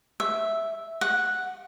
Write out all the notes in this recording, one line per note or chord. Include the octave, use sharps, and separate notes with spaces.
E5
F#5